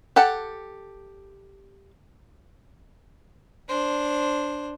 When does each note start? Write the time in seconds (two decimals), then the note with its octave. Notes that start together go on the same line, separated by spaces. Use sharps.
0.16 G4 A4 F#5 A5
3.68 D4 C5